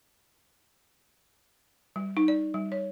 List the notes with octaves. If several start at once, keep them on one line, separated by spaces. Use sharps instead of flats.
G3
D#4
D5
G3
C#5